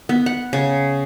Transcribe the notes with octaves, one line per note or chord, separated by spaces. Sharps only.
B3
F#5
C#3